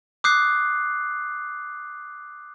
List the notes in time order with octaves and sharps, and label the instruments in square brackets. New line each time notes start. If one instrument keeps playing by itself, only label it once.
[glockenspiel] D6 D#6 F#6 G6 C7